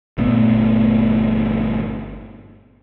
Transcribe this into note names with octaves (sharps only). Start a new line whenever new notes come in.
G1 A#2 A3 B3